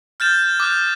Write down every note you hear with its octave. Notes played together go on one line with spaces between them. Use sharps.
F6 G6 A6 E7
D6 D#6 F#6 G6